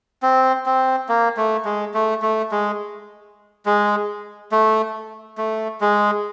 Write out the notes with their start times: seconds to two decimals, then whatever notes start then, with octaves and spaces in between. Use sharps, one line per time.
0.23 C4
0.66 C4
1.09 A#3
1.37 A3
1.65 G#3
1.94 A3
2.22 A3
2.51 G#3
3.66 G#3
4.52 A3
5.38 A3
5.81 G#3